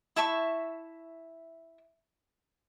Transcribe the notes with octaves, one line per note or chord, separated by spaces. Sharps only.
E4 E5 A5 C#6